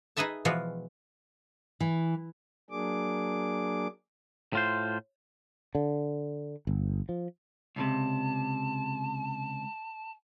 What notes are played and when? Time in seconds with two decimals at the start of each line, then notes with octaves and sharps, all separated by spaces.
0.17 D#4 G#4 B4 D#5 E5 A5
0.45 B2 E3 F3 G#3 F4 F#4
1.80 E3
2.70 F#3 A#3 D4 G#4 D6
4.53 A2 F4 C5
5.75 D3
6.67 G1
7.09 F3
7.76 C#2 A2 C3 A5